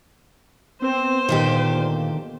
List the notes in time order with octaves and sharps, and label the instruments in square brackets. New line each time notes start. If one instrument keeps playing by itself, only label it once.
[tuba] B3 [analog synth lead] C4 [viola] C5
[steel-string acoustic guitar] D2 D#3 G4 [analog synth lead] A#2